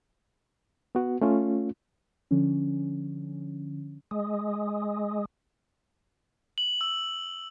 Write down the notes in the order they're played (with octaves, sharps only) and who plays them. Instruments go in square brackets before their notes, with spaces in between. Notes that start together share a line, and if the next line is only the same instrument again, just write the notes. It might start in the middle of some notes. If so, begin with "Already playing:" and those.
[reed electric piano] B3 F#4
A3 C#4 F4
[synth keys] D3 F3 C#4
[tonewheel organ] G#3
[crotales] F#7
E6